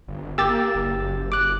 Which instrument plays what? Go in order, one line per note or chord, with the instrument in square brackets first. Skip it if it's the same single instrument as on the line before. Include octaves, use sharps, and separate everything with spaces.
[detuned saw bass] G1
[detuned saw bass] A#3 [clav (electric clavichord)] G4 [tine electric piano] E6 A6
[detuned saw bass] F#1
[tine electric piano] D6 F#6